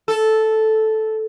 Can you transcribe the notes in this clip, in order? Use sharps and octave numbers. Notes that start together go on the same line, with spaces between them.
A4